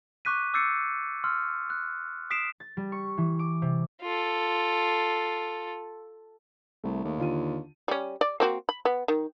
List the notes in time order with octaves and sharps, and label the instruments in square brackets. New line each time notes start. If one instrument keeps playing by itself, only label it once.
[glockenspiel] C#6 D6 F#6 B6 D#7
D6 E6 G6 A6 C7 C#7
C6 E6 F6
F#6
D#6 B6 C7 D7 E7
[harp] A6
G3
C#6
E3
D6
C3
[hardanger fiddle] F4 A4
[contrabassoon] C2 [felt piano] A3
[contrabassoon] D#2
[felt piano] D3 F4 D#7
[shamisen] G3 C#4
D5
A#3 C4 F#4
B5
B3
D#3